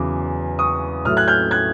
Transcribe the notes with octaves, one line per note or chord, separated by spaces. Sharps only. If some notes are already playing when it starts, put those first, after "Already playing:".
Already playing: E2 C#3 F#3 D6
C#6 D#6
A2 F#3 A3 D#6 F6
F#6 G#6
F6 G6
F#6 G#6